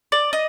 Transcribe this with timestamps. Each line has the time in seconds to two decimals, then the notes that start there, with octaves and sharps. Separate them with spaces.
0.12 D5
0.33 D#5